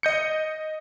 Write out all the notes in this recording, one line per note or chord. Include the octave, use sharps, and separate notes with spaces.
D#5 G6 C#7